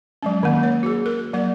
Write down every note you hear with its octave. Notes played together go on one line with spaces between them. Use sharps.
F#3 G#3 C#4
D#3 A#3
C#5
F#4 G#4
A#4
F#3 A#3 D5